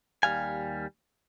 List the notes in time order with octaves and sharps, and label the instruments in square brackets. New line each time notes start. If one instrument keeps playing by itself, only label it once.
[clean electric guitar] D#2 G3 F5 G#5